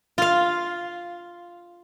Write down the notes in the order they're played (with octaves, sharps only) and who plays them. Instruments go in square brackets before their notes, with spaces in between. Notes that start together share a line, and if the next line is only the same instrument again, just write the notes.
[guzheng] F4 F5